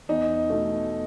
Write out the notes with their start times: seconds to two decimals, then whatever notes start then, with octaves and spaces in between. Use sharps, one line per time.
0.09 E2 D#4
0.50 B2 A3